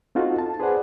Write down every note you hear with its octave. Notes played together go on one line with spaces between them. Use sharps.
C4 D#4 F4 F#4 A4
A5
G#4 B4 C5 D5 F#5